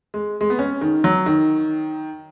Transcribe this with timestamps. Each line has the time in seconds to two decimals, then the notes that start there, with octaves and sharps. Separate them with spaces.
0.14 G#3
0.41 G#3
0.50 B3
0.59 C#4
0.81 D#3
1.04 F#3
1.26 D#3